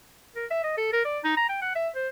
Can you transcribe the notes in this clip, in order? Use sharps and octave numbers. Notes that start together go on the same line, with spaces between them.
A#4
E5
D#5
A4
A#4
D5
D#4
A#5
G5
F#5
E5
C5